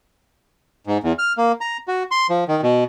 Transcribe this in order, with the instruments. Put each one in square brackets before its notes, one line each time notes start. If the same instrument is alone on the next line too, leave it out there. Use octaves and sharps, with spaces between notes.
[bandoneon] G#2
E2
F6
A#3
A#5
F#4
C6
F3
D#3
B2